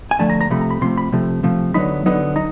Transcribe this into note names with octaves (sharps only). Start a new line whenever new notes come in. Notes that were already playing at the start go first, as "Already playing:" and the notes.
G#5
D3 F3 A3 A5
A#5
A#5
C3 F3 A3 B5
A#5
B5
C3 F3 A3 C6
B5
C3 F3 A3
C3 F3 A3
D3 F#3 B3 D#4 B5
D3 F#3 B3 D#4
D#4 A#5